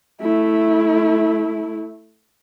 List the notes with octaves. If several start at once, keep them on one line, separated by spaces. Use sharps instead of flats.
A3 E4